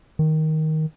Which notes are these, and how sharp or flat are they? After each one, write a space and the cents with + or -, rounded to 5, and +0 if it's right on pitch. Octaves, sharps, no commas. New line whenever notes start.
D#3 +10